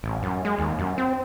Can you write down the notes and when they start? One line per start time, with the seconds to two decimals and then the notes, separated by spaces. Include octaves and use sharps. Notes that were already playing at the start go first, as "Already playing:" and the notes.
0.03 A1
0.23 F#2
0.45 G#3
0.59 D#2
0.79 F#2
0.98 C4